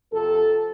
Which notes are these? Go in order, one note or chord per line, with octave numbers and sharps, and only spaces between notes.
F2 C3 F3 A4